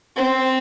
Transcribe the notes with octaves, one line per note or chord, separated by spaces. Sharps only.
C4